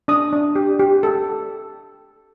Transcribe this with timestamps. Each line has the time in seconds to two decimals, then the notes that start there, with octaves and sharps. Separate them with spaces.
0.08 D4 D#6
0.33 D4
0.55 G4
0.79 G4
1.03 A4